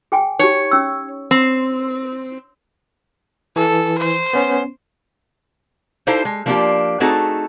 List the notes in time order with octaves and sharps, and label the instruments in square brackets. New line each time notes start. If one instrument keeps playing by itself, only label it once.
[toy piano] G#4 G5 G#5
[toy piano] D#4 G4 [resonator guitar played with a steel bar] C#5
[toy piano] C#4 E6
[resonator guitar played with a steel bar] C4
[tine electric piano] E3 [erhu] A4
[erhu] C5
[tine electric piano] B3 C#4
[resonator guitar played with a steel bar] D#4 E4 G4 A4 C5 F5
G#3
F3 A#3 D4 D#4 F4 G4
A3 C4 D#4 F#4 G#4 A4